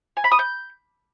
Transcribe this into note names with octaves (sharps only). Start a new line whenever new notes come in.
G#5
B5
D#6
G6